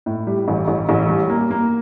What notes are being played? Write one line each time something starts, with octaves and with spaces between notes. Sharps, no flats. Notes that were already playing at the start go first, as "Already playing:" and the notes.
A2
G3
A1
A1
A1
G3
A#3
A#3